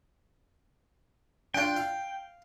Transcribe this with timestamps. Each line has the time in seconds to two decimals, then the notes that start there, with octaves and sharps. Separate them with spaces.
1.54 D4 F4 G5
1.76 F5